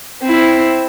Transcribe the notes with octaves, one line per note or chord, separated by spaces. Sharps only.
C4 E4